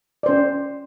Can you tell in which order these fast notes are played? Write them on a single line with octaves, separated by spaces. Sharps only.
D5 C5 C#4